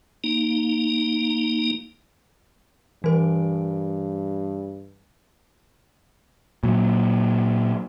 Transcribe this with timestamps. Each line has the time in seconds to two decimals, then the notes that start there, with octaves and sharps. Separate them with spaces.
0.24 A#3 D#4
3.04 G2 E3 A#4
6.63 A#2 F#3